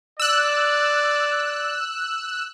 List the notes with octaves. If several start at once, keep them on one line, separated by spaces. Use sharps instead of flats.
D5 E6 F#6